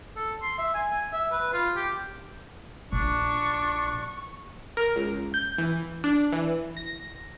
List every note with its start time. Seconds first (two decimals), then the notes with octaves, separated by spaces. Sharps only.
0.16 A4
0.42 C6
0.58 E5
0.75 G#5
1.13 E5
1.32 B4
1.54 F4
1.76 G4
2.92 A#1 D4 C#6
4.77 A#4
4.96 C#2
5.34 G6
5.58 E3
6.04 D4
6.32 E3
6.77 A#6